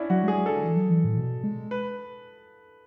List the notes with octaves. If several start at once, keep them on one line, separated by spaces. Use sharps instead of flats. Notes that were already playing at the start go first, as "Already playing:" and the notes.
Already playing: C#4 D4 E4
F#3 F#4
G#3 G#4
F#3
D3 A4
E3
F#3
E3
A2
B2
G#3
B4